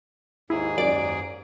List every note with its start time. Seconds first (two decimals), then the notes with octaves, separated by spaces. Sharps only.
0.50 D#2 G#2 E4 G#4
0.78 F#2 D5 D7